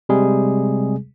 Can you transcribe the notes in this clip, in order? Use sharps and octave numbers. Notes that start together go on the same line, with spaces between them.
C3 G3 G#3 G#4